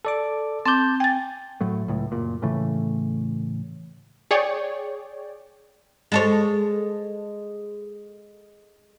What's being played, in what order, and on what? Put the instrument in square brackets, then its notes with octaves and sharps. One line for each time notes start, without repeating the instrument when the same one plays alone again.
[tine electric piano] A4 D5 D6
[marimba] C4 D6 [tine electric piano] A5 G6
[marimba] G5 A6 [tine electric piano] G#5
[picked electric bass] A2 F#3 A3
C#2 A2
F#1 A#2
A2 C#3 E3 A3
[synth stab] G#4 C#5 D5 G5
[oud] G#3 A4 C#5